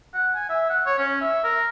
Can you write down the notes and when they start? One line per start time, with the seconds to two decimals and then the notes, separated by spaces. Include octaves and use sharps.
0.14 F#5
0.35 G#5
0.49 E5
0.70 F#5
0.86 C#5
0.99 C#4
1.21 E5
1.44 A#4